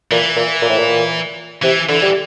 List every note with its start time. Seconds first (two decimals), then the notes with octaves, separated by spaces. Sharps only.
0.11 A#2 E3
0.36 A#2
0.62 A#2
0.70 A2
0.78 A#2
1.62 C3 E3
1.89 D3 E3
2.02 G3